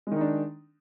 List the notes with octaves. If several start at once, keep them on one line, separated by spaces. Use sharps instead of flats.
D#3 G#3 D4 D#4